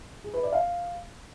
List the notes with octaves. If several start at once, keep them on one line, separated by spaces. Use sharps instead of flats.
G#4
B4
D5
F5